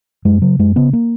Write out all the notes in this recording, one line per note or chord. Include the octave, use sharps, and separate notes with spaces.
F#2 G#3
C#3 F#3
F#2 G#3
C#3 B3
A#3